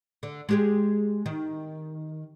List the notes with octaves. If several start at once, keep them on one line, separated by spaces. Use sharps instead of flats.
D3
G#3 G4 G#4
D#3